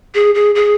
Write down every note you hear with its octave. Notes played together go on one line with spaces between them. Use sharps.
G#4
G#4
G#4